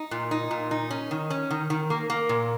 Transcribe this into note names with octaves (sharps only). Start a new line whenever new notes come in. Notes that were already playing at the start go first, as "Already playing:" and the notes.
Already playing: D#4
A#2
D#4
A#2
D#4
C#4
D#3
C#4
D#3
D#3
A#3
A#3
A#2